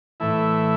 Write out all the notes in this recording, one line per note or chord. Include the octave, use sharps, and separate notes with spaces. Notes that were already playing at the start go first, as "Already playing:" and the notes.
A2 E3 A3 E4